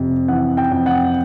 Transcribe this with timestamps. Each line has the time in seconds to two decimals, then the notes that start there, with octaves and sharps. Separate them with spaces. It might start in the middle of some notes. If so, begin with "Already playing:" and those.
Already playing: F2 C3
0.28 E3 F#5
0.57 G5
0.71 F2
0.86 F#5